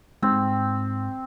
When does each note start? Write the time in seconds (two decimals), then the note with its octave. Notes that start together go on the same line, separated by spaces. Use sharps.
0.23 G#2 C4